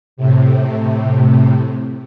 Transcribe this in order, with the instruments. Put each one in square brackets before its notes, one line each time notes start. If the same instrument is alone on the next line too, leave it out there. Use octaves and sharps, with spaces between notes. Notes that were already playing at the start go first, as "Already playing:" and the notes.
[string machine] A2 C3